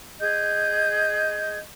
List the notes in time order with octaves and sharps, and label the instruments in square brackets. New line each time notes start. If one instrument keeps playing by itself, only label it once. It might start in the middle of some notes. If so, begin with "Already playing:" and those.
[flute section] G#4 D#5 G6